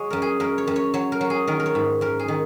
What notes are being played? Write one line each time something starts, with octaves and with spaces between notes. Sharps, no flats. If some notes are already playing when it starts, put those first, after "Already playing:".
Already playing: F#3 G#3 C#5
F#2 A#4
G#4
F#2 A#4
C#5
F#2
C#5
F#3 C#5
A#4
F#3
G#4
D#3 A#4
A#4
C#5
G#2
F#2 A#4
G#4
D#3